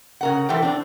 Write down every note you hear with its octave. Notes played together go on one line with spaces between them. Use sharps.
C#3 A#4 F#5
E3 A4 C5 G5
C4 D4